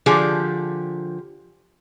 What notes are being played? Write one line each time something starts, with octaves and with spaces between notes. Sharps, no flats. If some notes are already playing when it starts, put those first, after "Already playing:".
D3 F3 G4 G#4